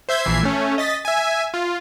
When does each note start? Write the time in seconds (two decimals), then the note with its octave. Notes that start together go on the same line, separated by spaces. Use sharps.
0.09 C5 E5 G6 G#6
0.23 A#1 E3 E5 G#6 C7
0.43 A3 C#4
0.78 D#5 A6 B6
1.05 E5 G#5
1.54 F4